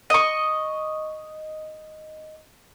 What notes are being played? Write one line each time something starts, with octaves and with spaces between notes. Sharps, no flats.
D#5 C#6